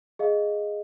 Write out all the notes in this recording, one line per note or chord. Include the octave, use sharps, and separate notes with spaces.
G#4 D#5 F5